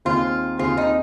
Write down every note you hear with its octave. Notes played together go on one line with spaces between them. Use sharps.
D#2 D#3 C4 F4 G#4 C5
D#2 D#3 C4 F4 G#4 C5
D#4